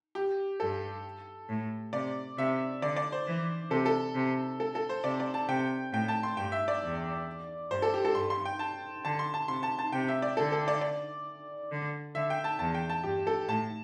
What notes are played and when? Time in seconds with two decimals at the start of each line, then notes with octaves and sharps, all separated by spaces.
0.15 G4
0.60 G2 A4
1.49 A2
1.93 C3 D5
2.38 C3 E5
2.82 D3 D5
2.96 D5
3.12 C5
3.27 E3
3.71 C3 A4
3.86 A4
4.15 C3
4.60 A4
4.75 A4
4.89 C5
5.04 C3 D5
5.20 D5
5.34 A5
5.48 C3 G5
5.93 A2 G5
6.08 A5
6.23 C6
6.37 G2 G5
6.52 E5
6.68 D5
6.82 E2
7.71 G2 C5
7.82 A4
7.94 G4
8.05 A4
8.15 G2 C6
8.30 C6
8.45 G5
8.59 A5
9.04 D3 A5
9.19 C6
9.34 A5
9.48 C3 C6
9.63 A5
9.79 A5
9.92 C3 G5
10.08 E5
10.22 D5
10.37 D3 A4
10.52 A4
10.68 D5
10.81 D5
11.71 D3
12.15 D3 E5
12.30 G5
12.44 A5
12.59 E2 A5
12.74 G5
12.89 A5
13.04 G2 G4
13.27 A4
13.48 A2 A5